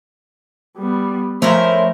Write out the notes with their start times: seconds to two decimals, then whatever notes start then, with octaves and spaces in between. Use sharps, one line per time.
0.77 G3 B3
1.42 F3 A3 C#4 E4 A#4 C5